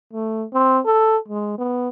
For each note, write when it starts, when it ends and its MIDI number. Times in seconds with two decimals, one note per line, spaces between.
0.13 0.45 57
0.53 0.80 60
0.85 1.17 69
1.28 1.55 56
1.58 1.89 59